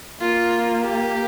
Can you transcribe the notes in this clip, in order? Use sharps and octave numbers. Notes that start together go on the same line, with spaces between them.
A#3 F4
G4